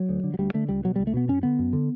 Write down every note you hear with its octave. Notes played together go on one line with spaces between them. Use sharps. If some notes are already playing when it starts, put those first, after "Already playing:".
Already playing: F#3
D2
D3
F#3
D2 G3
D3 A3
C#2 G3
B2 F#3
C#2 G3
A3
B2 B3
F#2 C#4
D3 B3
F#2
D3